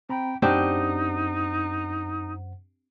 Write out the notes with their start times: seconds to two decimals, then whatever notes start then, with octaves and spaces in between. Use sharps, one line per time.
0.09 C4 G5 A#5 B5
0.42 F#2 C4 D4 D#4 G4 C5 F#5